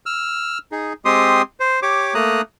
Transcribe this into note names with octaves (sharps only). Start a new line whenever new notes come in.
E6 F6
D#4 G#4
G#3 C4 G4 C6 D#6
C5
G4 C#5 D6
A3 A#3 A#5 D#6 F#6